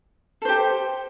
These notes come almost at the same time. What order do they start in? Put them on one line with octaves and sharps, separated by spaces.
A4 C5 G4